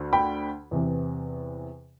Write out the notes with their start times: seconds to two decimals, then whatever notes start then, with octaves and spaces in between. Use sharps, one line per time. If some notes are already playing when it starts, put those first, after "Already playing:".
Already playing: D2 D3
0.13 G5 B5
0.71 E2 C3 E3